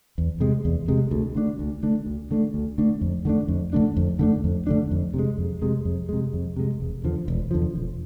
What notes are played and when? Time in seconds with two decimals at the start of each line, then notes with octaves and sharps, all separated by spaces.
0.18 E2
0.40 C3 G#3
0.65 E2
0.88 C3 G#3
1.11 D2
1.35 D3 A3 D4
1.59 D2
1.83 D3 A3 D4
2.06 D2
2.31 D3 A3 D4
2.54 D2
2.78 D3 A3 D4
3.01 F2
3.25 D3 A3 D4
3.48 F2
3.73 D3 A3 D4
3.97 F2
4.19 D3 A3 D4
4.44 F2
4.67 D3 A3 D4
4.91 F2
5.14 C3
5.19 G#3
5.38 F2
5.62 C3 G#3
5.85 F2
6.09 C3 G#3
6.33 F2
6.57 C3 G#3
6.80 E1
7.04 E2 D3 F3
7.28 E1
7.51 E2 D3 F3
7.75 E1